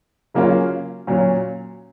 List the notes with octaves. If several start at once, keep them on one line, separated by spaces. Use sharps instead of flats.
C#3 F#3 A#3 C#4 F4
A#2 F#3 C#4